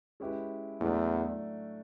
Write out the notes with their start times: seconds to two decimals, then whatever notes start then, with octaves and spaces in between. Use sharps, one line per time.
0.20 G#3 C#4 E4 G4 B4
0.80 E2 A2 F#3 A3 D4